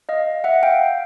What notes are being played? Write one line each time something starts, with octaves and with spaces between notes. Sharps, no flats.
D#5 F5
E5 F#5
F5 G5